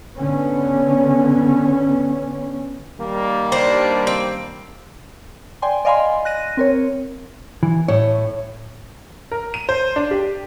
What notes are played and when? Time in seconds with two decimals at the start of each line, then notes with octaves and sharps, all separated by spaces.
0.17 D3 B3 C#4
2.99 D#3 G3 A#3
3.52 D4 C5
4.07 C4
5.62 D5 G5 G#5 C6
5.85 D5 D#5 F5 G#5 B5 C6
6.25 F#6 A#6 D#7
6.57 C4 A#4 C#5
7.63 E3
7.88 A2 C#5
9.31 A#4
9.54 D#7
9.69 C5
9.96 D4
10.11 G4